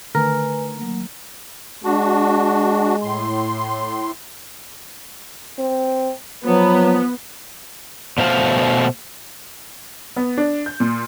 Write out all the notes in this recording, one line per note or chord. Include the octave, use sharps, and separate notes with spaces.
D3 D#3 A3 A#4 B4 G#5
F#3 A#3
G#3 D4 F#4
A2 C6
C4
F3 F#3 B3
B2 A3 C5 F5
B3
D4
G6
A#2